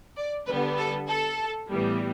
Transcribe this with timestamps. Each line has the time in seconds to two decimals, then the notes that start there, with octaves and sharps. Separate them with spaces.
0.17 D5
0.47 D3 G3 B3 B4
0.77 A4
1.08 A4
1.70 A2 E3 G3 B3